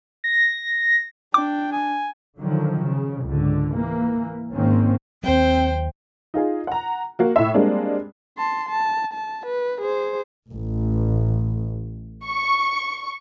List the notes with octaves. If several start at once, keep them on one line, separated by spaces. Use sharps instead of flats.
A#6
D4 G5 D6
G#5
D3 D#3 F3 F#3
C#3
C#2 G#2 D3
E3 A#3
G#1 G#2 D#3 A#3 C4 C#4
D#2 F#3 C4 C5 G5
D#4 F4 G#4
F#5 A#5
A#3 F#4
A2 E5
G3 G#3 A#3 C4 D4
A5 C6
A5
A5
B4
G#4 C5
A1
C#6